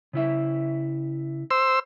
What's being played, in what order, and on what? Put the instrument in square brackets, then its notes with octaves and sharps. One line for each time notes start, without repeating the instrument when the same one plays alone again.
[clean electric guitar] C#3 E4 E5
[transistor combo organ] C5 E6